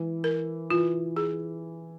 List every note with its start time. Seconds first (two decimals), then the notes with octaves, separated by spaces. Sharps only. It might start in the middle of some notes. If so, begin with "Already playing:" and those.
Already playing: E3 G#3
0.24 A#4
0.70 E3 F4
1.16 G#4